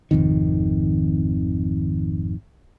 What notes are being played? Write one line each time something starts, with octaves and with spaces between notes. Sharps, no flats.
G#1 F2 C3 D#3